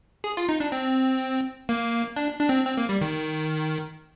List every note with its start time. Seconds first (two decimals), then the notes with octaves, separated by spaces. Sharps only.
0.24 G#4
0.37 F4
0.49 D#4
0.60 D4
0.72 C4
1.69 A#3
2.16 D4
2.40 D4
2.49 C4
2.66 C4
2.77 A#3
2.89 G3
3.01 D#3